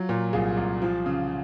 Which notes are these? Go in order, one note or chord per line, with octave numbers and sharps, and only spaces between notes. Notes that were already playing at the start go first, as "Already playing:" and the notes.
Already playing: F#3 F4
A#2
C2 F4 G#4
C2
F3
C#3